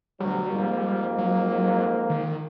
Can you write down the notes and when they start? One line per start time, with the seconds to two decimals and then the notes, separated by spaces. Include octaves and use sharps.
0.20 D2 B2 F#3 G3
0.51 F2 G#2 A#3
1.18 F#3
2.10 D#3